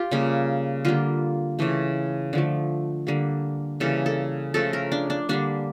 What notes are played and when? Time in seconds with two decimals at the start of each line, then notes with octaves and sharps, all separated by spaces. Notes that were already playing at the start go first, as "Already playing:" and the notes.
Already playing: F4 G4
0.11 C#3 G3 A#3
0.85 D3 G3 A#3 F4
1.59 C#3 E3 A3
2.33 D3 F3 A3
3.07 D3 G3 A#3
3.80 C#3 E3 G3 A#3 A4
4.06 A4
4.54 C#3 F3 A3 A4
4.73 A#4
4.92 D4
5.10 D4
5.29 D3 G3 A#3 D4